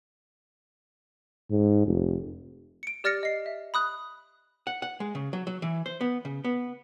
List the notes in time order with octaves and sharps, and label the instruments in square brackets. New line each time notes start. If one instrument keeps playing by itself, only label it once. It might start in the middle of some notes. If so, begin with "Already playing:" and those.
[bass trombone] G#2
F1
[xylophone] C#7 D7
G4 D5 F6 A6 A#6 C#7
D#5 C7
E5
B5 D#6 F#6
[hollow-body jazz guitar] F#5
F#5
G#3
C#3
F#3
F#3
E3
C5
B3
C#3
B3